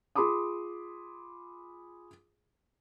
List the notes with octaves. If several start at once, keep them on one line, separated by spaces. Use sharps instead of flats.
F4 G#4 B5 C6 D6 D#6